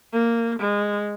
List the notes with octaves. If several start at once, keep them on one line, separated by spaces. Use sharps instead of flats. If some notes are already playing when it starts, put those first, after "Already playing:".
A#3
G#3